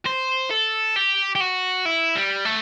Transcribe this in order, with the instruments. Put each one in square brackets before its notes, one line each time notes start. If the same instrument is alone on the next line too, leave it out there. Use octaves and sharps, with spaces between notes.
[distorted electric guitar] C5
A4
G4
G4
F#4
E4
G3
A3